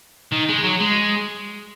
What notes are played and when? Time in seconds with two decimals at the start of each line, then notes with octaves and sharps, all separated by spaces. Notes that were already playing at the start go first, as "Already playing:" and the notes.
0.32 D#3
0.49 G#3
0.64 F#3
0.81 G#3